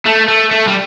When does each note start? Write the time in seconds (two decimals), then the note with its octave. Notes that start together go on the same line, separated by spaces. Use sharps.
0.06 A3
0.28 A3
0.51 A3
0.68 G3